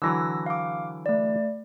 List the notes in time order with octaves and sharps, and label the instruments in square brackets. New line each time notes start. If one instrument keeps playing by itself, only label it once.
[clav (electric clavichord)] D3 E3 F#3 [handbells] E6 A#6
[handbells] F5 D6
A3 D5